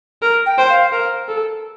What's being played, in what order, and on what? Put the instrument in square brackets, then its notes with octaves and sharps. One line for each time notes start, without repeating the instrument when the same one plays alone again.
[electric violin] A#4
[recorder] G5
[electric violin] C5
[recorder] F5
[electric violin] A#4
A4